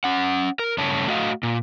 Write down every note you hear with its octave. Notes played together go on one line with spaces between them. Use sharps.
C#4 F#5
A#4
G2 C#3 A3 C#5 A5
A3 F#4 D#5 F5
A#2